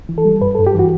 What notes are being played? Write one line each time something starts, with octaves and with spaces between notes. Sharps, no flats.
E3
A4
G3
G2 B4
A4
G2
G4
E3 F#4